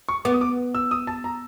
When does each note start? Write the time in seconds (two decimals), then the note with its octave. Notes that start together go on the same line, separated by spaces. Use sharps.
0.09 C#6
0.25 B3 D6
0.34 D#6
0.41 D6
0.75 E6
0.91 D#6
1.07 A5
1.24 A#5